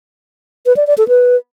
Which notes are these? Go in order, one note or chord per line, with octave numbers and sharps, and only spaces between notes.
B4
D5
D5
A4
B4